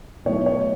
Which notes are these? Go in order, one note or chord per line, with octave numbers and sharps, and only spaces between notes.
B1 A2 F#3 A3 C#5
C#5